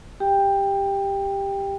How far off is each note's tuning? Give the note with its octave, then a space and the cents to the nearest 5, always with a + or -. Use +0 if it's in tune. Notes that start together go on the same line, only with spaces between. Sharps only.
G4 +5 G5 +15